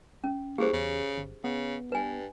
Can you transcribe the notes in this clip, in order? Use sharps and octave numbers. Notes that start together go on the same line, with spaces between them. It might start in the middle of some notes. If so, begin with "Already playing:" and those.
C#4
E2 A#3 G4 G#4 C5
E2 C#3
G1
C#3 B3
G2 B4 G#5